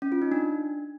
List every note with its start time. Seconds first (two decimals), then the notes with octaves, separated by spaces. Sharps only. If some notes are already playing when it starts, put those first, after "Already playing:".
0.02 C#4
0.12 F4
0.22 D#4
0.32 D4